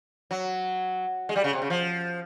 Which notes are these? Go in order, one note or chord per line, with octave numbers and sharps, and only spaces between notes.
F#3
G#3
G3
C#3
C3
C#3
F3